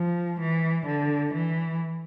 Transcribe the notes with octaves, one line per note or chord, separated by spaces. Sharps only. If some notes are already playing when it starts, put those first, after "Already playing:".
Already playing: F3
E3
D3
E3